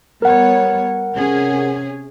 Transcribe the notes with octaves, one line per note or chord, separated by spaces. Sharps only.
G3 B3 A#4 C#5 F#5
C3 C#4 G#4